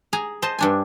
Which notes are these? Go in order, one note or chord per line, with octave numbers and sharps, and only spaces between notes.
G#4 G#5 A#5
C5 D#5 A5
G2 D4 G#5